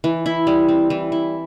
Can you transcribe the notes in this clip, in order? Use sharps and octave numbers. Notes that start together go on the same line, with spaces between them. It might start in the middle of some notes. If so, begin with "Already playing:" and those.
E3
E4
G3
C4
E3
E4